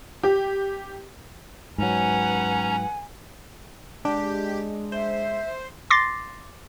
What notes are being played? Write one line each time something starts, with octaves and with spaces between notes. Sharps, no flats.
G4
G#2 F#3 C#4 B4 F#5 G#5 A#5
G#3 D4 G4
C5 E5
C6 D6 A6 A#6 C7